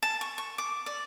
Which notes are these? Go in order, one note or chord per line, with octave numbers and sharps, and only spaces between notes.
A5
C#6
C#6
D6
D5